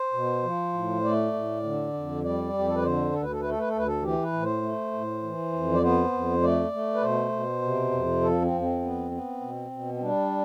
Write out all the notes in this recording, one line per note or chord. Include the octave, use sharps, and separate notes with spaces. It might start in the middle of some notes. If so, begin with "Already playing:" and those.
Already playing: C5
B2
F3
A2
A3 D5
A2
D3
F2
G3 D5
F2
G4
A4
B4
D3 C5
D2 A4
B4
A4
A3 B4
A4
B4
A4
D2 B4
A4
E3 G4
B4
A2
C5
A3
A2
E3
F2
D5
B3 C5
F2
A3 D5
A3
B4
B2 C5
B2
C3
F2
F3 A4
C4
F2
C4
B3
B3
B2
B2
C4
G3 D4